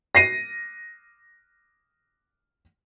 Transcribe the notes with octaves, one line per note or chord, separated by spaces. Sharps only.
A#6 C7 D#7